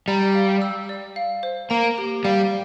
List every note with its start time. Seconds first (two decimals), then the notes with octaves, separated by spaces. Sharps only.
0.08 G3 A#5
0.35 F5
0.62 E6
0.89 D5
1.16 F5
1.43 C5
1.70 A#3 A#5
1.98 G4
2.25 G3 F5